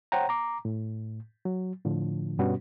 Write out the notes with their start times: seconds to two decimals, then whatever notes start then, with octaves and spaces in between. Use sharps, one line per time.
0.12 C5 C#5 F#5 G5 A#5
0.29 A#5 D6
0.65 A2
1.45 F#3
1.85 A2 D3 F3
2.39 G2 B2 G3 B3 C#4 F#4